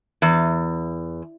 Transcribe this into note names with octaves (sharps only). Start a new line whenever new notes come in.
E2